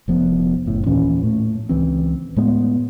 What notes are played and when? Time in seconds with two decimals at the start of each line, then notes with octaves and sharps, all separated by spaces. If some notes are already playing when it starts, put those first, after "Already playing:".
0.08 F1 F3 B3
0.66 F#1 A2
0.86 D#2 A#2 E3 C#4
1.23 A2 A3
1.69 C#2 E3 C4
2.36 A2 G#3 A3 B3